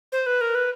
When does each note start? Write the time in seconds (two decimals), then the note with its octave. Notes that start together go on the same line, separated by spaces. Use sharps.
0.12 C5
0.26 B4
0.41 A#4
0.55 B4